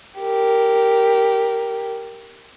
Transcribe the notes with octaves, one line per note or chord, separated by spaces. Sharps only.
G4 A#4